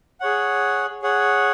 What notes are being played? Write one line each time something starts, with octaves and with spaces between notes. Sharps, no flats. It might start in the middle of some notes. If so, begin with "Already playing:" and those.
G#4 C#5 F#5
G#4 C#5 F#5